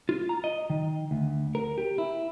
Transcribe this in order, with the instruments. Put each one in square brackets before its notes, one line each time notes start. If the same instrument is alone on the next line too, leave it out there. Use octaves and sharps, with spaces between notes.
[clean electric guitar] F4
A#5
D#5
D#3
D2
A#4
G4
E4